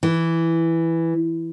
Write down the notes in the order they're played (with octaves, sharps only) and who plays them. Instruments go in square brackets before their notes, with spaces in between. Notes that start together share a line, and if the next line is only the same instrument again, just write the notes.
[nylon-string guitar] E3